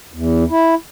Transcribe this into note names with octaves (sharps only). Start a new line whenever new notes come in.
E2
E4